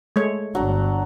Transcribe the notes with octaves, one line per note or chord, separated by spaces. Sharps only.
G#3 A3 C#5
G1 F#3 D4